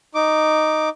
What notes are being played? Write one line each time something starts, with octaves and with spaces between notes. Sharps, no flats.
D#4 D6